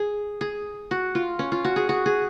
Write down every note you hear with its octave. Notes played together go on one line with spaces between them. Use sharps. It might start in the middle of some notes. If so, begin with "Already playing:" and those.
Already playing: G#4
G#4
F#4
F4
C#4
F4
F#4
G#4
F#4
G#4